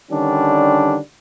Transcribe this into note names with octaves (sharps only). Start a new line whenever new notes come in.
D3 D#3 G3 C#4 D4